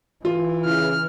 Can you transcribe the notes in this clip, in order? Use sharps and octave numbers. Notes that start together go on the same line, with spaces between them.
E3 F4
C#3 E4 F6